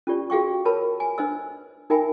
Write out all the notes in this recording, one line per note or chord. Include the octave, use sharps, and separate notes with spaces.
C#4 F4 G4 D5
F#4 G#4 F5 G5 C#6
A#4 B4 C#5 A5 B5
G#5
D4 B4 C5 D#5 E6
D#4 A#4 E5 G5 G#5 B5